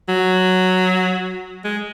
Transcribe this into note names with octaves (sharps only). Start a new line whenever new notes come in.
F#3
G#3